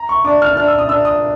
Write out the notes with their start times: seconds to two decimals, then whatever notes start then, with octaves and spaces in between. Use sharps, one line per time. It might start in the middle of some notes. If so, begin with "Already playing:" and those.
Already playing: A#5
0.09 C#6
0.25 D4 D6
0.42 F6
0.57 D4 F6
0.68 E6
0.78 D#6
0.89 D4 E6
1.05 D#6